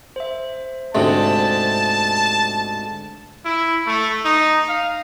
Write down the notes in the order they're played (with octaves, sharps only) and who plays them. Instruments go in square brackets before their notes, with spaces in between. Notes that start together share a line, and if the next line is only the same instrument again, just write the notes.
[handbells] C5 E5
[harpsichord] D2 G#2 C3 [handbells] C5 E5 [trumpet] A5
[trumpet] E4
A3
D#4
F5